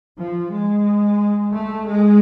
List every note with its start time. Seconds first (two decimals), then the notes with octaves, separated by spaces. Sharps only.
0.18 F3
0.51 G#3
1.52 A3
1.86 G#3